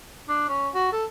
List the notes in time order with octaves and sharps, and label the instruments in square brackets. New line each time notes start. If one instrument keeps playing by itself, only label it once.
[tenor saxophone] D4
C#4
F#4
A4